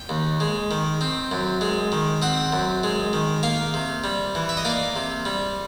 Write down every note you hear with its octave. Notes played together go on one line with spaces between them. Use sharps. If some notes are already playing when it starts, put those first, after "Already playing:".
Already playing: G5
D#2
G#3
D#3
C4
F#2
G#3
D#3
C4 F#5
F#2
G#3
D#3
A#3 F5
C3
G3
E3
E5
D#5
A#3 D5
C3
G3